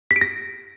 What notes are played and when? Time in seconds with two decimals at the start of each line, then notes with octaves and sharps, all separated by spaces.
0.11 B6
0.16 D7
0.21 A#6